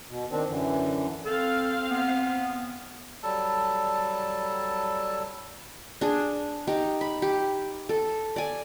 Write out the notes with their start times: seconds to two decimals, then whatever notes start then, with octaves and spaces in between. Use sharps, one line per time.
0.10 B2
0.31 D#3 C4 D4
0.48 F#2 D3 E3
1.26 C4 A4 F5
1.90 B3
3.23 F#3 G3 A4 A5
6.01 D4 G#4
6.67 D#4 G4
7.01 B5
7.22 G4
7.89 A4
8.36 D5 G#5